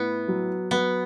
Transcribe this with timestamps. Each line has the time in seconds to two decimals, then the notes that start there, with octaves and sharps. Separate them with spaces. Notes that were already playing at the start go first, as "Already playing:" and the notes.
Already playing: A2 B3 E4
0.28 F#3
0.71 F#3 B3